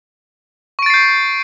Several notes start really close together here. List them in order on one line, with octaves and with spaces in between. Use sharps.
C#6 D7 A6 C7 G6